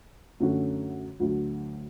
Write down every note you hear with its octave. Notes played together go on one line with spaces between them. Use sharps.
F#2 D3 A3 C#4 F#4
D2 D3 F#3